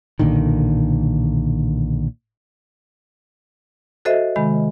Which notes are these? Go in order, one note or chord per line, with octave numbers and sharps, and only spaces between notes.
B1 A#2 D3 D#3
F#4 A4 C5 D#5 E5
C3 D#3 G#3 B5